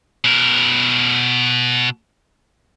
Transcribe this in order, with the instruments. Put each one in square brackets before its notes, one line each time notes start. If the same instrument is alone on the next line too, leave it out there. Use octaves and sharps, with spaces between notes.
[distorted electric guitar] B2 A#4